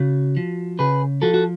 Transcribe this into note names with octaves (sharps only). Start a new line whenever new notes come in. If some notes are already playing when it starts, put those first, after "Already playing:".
Already playing: C#3 F#4
F3
C#3 G#4 B4
F3 F#4 A4
F#4